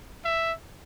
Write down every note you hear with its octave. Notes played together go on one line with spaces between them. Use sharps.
E5